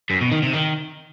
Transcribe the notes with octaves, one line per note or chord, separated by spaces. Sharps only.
F#2
B2
D#3
C3
D#3